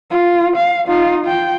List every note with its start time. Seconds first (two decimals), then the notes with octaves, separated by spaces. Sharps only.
0.10 F4
0.57 F5
0.88 D#4 F4
1.25 F4 G5